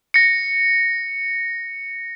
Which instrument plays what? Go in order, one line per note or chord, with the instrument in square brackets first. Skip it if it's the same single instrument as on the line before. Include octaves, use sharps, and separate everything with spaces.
[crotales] A#6 C#7